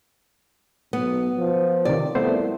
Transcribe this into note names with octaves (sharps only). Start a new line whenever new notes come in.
B1 B3
F3
C3 D#3 D5
C2 A3 B3 C5